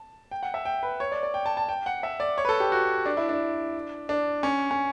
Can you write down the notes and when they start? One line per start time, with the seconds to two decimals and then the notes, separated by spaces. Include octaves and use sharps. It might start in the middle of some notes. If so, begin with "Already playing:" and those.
Already playing: A5
0.31 G5
0.43 F#5
0.54 E5
0.65 G5
0.83 B4
1.00 C#5
1.12 D5
1.23 D5
1.34 G5
1.46 A5
1.57 A5
1.69 G5
1.86 F#5
2.03 E5
2.20 D5
2.38 C#5
2.45 B4
2.49 A4
2.60 G4
2.72 F#4
3.06 D4
3.17 E4
3.29 D4
4.09 D4
4.43 C#4
4.71 C#4